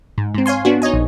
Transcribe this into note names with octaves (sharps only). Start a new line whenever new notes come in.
G#2
G#2 C4
C#5 F5 G#5 C6
B3 D4 F#4
D#4 C#5 D#5 G#5
A#1